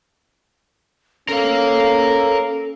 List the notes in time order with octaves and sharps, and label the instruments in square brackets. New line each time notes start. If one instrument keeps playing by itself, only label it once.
[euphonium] C#4 [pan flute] A4 [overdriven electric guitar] A#4 F5